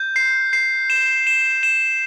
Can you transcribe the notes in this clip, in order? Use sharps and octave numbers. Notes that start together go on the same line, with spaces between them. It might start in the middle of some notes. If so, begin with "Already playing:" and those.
Already playing: G6
C7
C7
E7
E7
E7